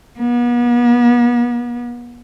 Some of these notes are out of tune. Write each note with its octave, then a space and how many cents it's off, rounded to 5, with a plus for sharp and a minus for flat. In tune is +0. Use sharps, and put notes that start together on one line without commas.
B3 -40